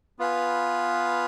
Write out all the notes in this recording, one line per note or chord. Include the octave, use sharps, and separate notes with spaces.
B3 F4 B4 F5 G#5